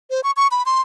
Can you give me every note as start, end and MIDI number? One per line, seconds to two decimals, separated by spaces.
0.10 0.21 72
0.24 0.31 85
0.37 0.48 85
0.51 0.63 83
0.66 0.81 84